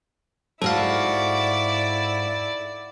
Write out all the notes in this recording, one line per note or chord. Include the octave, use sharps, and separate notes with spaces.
G#2 E4 F#4 A4 D5 F5